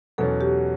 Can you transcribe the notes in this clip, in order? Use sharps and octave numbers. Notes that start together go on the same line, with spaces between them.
E2 B2 F#3 C#4 A4
G4